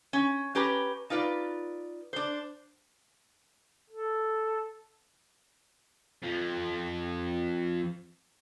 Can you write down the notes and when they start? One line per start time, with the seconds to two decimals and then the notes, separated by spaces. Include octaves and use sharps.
0.13 C#4
0.55 C#4 G4 B4 A#5
1.10 D#4 F4 B4 D5
2.13 D4 C5
3.90 A4
6.23 F2 F3